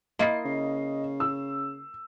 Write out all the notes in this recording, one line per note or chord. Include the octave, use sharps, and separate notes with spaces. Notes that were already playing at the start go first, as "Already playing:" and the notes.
A#3 E4 F4 D#5 C7
C#3
E6